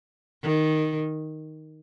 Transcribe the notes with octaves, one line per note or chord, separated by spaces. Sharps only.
D#3